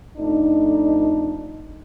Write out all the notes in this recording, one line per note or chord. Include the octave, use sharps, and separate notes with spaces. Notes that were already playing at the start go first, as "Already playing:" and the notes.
F2 A3 D4 D#4